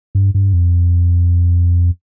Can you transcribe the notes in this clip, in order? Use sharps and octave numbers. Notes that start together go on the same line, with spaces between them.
G2
G2
F2